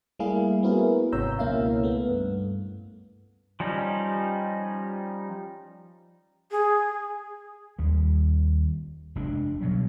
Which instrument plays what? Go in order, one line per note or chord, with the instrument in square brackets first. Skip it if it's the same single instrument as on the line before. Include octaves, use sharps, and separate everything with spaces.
[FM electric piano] G3 A3 A#3 E4 G#4 F5
B3 C4 E4 F#4 G#4 A#4
G#1 C3 C#5 A#5 E6 G6
C#2 B2 A#3 C#4 E4 F5
A3 B3
G2
[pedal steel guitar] F3 G3 C#4 D#4
[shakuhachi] G#4
[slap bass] D#2 G3
F1 G#3 D4
B2 F#3 G3